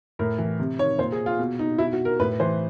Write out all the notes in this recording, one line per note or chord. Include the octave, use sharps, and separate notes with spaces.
A2 A#4
E3
C3
D#3 C#5
A#2 C5
G#4
F4
B2
D#4
B2 E4
F#4
A#4
A2 B4
E3 C5